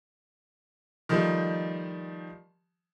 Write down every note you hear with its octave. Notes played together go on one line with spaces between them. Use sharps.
D#3 F3 G3 A3